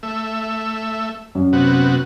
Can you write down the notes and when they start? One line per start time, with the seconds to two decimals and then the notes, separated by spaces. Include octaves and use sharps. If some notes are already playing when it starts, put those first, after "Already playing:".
0.03 A3 E5
1.35 F#2
1.53 C3 B3 F#4